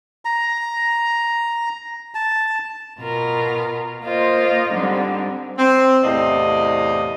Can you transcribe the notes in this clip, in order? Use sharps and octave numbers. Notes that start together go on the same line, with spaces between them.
A#5
A5
B2 F4 A#4
A#3 F4 C5 D#5
G#2 D3 G3 C4
C4
E2 A2 C3 D5 D#5 F5